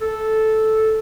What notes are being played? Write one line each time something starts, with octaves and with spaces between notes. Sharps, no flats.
A4